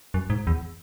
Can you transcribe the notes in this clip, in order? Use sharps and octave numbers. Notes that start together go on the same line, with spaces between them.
F#2
G#2
E2